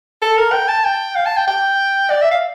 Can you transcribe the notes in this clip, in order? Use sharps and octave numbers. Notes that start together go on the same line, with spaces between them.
A4
A#4
G5
A5
G5
F5
A5
G5
G5
D5
E5
F5